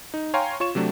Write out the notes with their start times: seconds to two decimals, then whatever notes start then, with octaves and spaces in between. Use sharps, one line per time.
0.14 D#4
0.34 C#5 F5 G5 G#5 A#5 C6
0.60 F4 C#5 C#6 E7
0.75 C3 F#3 A3 D4